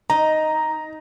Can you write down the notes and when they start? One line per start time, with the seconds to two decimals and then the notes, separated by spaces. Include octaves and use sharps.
0.10 D#4 A#5